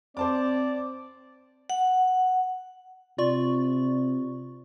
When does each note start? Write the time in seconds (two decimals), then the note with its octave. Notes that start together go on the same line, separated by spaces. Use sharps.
0.17 C4 C5 D5 A5 D6
1.70 F#5
3.18 C3 F4 D5 C#6